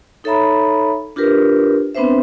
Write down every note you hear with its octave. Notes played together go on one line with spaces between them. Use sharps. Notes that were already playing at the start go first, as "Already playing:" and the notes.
D#4 A4 C#5 E5 A#5 B5
D4 F4 G4 A#4 B4
B3 C4 D4 B4 C5 E5